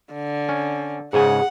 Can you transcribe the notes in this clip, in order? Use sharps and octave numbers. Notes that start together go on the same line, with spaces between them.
D3
C#4
G#2 C#3 G#4 F#5 G#5